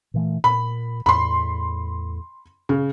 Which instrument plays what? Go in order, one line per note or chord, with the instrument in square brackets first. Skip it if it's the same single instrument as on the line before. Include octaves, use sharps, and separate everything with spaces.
[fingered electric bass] A#2 E3 A3
[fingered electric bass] A#2 [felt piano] B5
[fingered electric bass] E2 A2 [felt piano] B5 C6
[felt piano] C#3